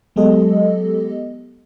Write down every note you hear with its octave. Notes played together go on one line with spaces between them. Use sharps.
F#3 G#3 B3 G4 A4 D#5